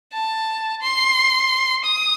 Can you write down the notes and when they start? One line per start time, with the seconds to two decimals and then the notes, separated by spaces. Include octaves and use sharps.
0.13 A5
0.82 C6
1.85 D#6